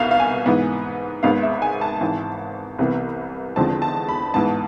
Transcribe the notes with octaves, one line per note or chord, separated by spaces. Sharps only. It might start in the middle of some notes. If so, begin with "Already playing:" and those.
Already playing: C2 B2 B3 F5
F5
G#5
G#2 E3 B3
G#1 G#2 G#3 B3 F5
E5
G#5
A5
G#1 G#2 E3
C2 C3 E3 B3
E2 D3 F3 G#3 C4 A5
A5
B5
A1 G#2 E3 B3 A5